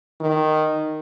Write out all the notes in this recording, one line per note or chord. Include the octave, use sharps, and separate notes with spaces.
D#3